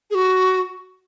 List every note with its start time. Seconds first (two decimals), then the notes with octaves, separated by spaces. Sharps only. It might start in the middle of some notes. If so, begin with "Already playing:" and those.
0.11 G#4
0.15 F#4